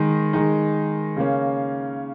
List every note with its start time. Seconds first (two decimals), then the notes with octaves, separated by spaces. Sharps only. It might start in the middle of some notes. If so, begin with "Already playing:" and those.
Already playing: D#3 G#3 D#4
0.33 D#3 G#3 D#4
1.17 C#3 A#3 C#4